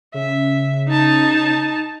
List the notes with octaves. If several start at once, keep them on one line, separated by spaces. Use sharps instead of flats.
C#3 E5
D#4 A5